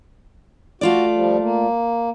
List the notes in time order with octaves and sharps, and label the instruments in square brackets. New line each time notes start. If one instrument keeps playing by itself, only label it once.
[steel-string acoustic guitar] A3 F4 D5 [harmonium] F#4
[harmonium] F3 G3
A#3